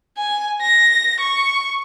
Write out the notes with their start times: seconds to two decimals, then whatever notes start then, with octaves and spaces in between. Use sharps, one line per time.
0.18 G#5
0.61 A#6
1.20 C#6